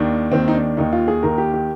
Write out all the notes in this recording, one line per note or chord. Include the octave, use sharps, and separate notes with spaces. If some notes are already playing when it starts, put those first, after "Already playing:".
Already playing: D#2 D#3 D4
D#2 D#3 C4
D#4
D4
D#2 D#3 D#4
F4
G#4
D#2 D#3 A#4
G4
G4